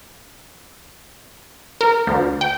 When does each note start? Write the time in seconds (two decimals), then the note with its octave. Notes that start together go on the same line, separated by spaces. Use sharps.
1.81 A#4
2.07 D2
2.41 G5